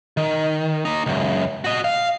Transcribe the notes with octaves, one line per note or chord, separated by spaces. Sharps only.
D#3
A#3 D#4
C#2 F#2
F#4 D#5
F5